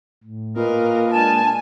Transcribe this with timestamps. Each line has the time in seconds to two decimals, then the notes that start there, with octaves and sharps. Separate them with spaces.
0.24 A2
0.56 A#2 A#4 B4 D#5 F5
1.12 G#3 D4 G#5 A5